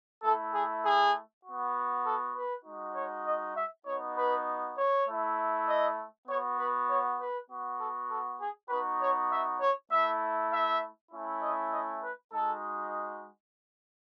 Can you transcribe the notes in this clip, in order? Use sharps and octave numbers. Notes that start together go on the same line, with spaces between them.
A3 E4 A4
G#4
G#4
B3 F#4
A4
B4
G#3 D#4 F#4
C#5
D#5
E5
B3 D#4 F#4 C#5
B4
C#5
A3 E4
D#5
B3 F#4 C#5
B4
C#5
B4
B3 F#4
A4
A4
G#4
B3 D#4 F#4 B4
C#5
E5
C#5
A3 E4 E5
E5
A3 C#4 E4
D#5
D#5
B4
G#3 D#4 F#4 A4